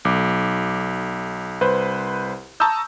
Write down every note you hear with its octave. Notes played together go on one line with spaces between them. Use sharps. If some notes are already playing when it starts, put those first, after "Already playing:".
B1 D6
C2 B4 C5
A5 A#5 C#6 D#6 E6 G6